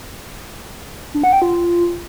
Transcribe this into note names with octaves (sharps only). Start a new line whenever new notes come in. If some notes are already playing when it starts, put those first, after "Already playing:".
D4
F#5
G5
F4